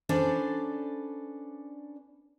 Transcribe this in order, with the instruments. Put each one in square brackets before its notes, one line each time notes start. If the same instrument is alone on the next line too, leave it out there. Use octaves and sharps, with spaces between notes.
[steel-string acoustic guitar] C#4 D4 A4 B4 C5 D5